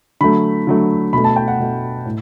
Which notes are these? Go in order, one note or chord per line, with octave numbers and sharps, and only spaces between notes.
D3 F#3 A3 B5
D3 F#3 A3
B2 A3 B5
A5
G5
F#5
B2 A3
A2